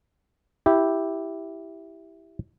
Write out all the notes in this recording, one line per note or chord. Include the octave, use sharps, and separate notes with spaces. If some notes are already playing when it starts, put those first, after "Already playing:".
E4 G4